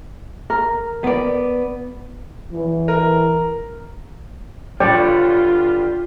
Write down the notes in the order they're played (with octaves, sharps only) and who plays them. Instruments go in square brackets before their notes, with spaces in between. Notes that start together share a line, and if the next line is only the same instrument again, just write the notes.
[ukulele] A#4
[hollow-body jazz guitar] B3 D5
[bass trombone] E3
[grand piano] A#4
[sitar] G2 D3 G3 [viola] F4 [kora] C#5 [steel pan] D5 G5